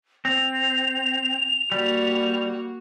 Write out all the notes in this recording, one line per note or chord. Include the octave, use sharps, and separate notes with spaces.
C4 F7
G3 A#3 F#4